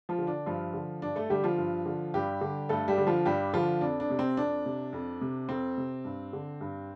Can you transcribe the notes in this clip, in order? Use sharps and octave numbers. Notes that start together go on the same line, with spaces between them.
F3 F4
D3
D4
G2 F3 F4
D3
G2 D4
A3 A4
D3 G3 G4
F3 F4
G2
D3
G2 G3 G4
D3
G2 A3 A4
G3 G4
D3
F3 F4
G2 G3 G4
D3 F3 F4
F2 D4
D4
C3
C4
F2 D4
C3
F2
C3
F2 C4
C3
G2
D3
G2